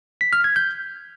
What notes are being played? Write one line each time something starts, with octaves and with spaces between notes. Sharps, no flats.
B6
F6
G#6
G6